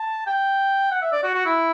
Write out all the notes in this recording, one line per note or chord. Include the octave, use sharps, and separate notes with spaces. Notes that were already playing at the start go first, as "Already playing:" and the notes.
Already playing: A5
G5
F#5
E5
D5
F#4
F#4
E4